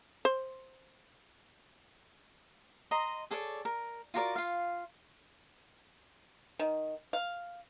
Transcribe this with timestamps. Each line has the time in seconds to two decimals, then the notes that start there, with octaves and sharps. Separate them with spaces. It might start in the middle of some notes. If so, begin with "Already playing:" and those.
0.25 C5
2.91 D#5 A#5 C6
3.31 G#4 A4 C#5 D5
3.65 A#4
4.14 F4 F#4 A#4 D5
4.36 F4 F5
6.59 D#3
7.13 F5